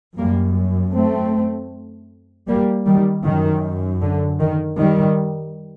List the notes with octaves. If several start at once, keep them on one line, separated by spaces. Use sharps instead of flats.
F#2 G3 A#3
A3 C4
G3 A#3
D#3 G3
F#2 D#3
D3
D#3
D#3 G3